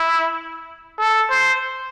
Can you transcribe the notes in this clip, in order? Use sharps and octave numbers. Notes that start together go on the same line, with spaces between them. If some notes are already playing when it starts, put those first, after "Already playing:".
Already playing: E4
A4
C5